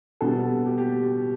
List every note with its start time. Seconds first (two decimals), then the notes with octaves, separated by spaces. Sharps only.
0.21 B2 G3 B3 A4
0.66 G4
0.78 G4